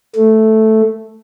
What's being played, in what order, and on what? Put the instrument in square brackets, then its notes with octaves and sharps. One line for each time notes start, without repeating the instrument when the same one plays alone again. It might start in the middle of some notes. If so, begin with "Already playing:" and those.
[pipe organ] A3